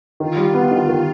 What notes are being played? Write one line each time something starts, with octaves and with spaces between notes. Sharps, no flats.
D#3 F4
G3
B3
D#3
D#3